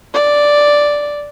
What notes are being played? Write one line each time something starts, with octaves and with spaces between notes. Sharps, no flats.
D5